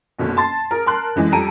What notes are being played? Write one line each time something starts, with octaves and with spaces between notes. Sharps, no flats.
F#1 B2 D3 C#4
A5 C6 A6
G#4 A#4
A#4 A5 C6 F#6
D3 E3 G#3
F2 G3 A4 A#5 D7 D#7